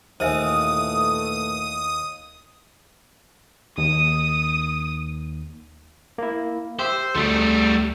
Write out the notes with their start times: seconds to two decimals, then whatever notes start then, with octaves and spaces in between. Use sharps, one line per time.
0.20 D#2 A#2 E3 A3 C5 E5 G#5 D#6
3.78 D#2 D#6
6.18 A#3 E4
6.79 G4 C5 E5 E6
7.15 D2 G3 A3